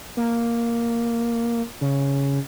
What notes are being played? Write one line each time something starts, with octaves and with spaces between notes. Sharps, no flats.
A#3
C#3